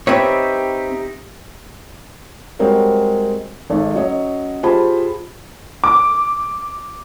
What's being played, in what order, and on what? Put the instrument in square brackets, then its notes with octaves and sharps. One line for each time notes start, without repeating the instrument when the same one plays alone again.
[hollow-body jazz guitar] C4 B4 C#5 [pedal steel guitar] D#4 G4 E5
[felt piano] G3 G#3 C4 F#4 A#4 C#5
G#1 G#2 G#3 A4 D5
F#3 C#4 C#5 D#5
F4 G4 G#4 C5 A5 B5
[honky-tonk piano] D6